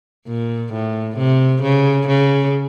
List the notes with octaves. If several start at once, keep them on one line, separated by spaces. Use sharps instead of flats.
A#2
A2
C3
C#3
C#3